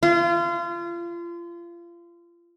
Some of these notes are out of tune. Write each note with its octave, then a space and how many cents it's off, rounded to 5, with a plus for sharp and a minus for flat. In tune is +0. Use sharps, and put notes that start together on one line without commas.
F4 -30